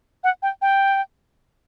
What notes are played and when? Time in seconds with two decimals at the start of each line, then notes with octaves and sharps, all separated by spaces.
0.24 F#5
0.42 G5
0.62 G5